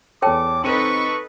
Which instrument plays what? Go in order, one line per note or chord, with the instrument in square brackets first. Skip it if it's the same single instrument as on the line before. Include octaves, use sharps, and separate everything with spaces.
[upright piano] E2 A4 [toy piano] C#5 G5 A5 [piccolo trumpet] D6
[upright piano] C4 D#7 [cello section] D#4 A4 B4 [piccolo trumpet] C#6